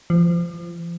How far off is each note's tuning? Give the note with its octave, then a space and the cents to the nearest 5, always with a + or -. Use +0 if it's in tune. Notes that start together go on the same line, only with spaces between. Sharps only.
F3 -30